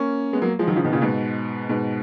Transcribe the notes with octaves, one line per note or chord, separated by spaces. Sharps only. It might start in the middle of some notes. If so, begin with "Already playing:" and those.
Already playing: A#3 C#4
G#3 B3
F#3 A#3
F3 G#3
D#3 F#3
C#3 F3
B2 D#3
A#2 C#3
G#2 B2
G#2 B2